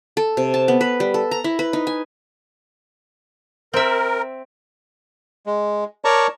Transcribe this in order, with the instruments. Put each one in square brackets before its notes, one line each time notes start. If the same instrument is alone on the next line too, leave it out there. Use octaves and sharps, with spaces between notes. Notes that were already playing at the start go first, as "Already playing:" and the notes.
[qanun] A4
C3
A5
B3
B4
G3
A4
A#5
E4
B4
D#4
G#5
[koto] C4 E5 [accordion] A#4
[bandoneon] G#3
A#4 C#5 D5 A5 A#5 C#6